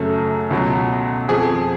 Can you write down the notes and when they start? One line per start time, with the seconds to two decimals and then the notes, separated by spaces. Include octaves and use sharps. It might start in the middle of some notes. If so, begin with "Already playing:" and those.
Already playing: F#2 C#3 F#3 A3
0.51 C#2 B2 F#3
1.28 F2 F3 G#4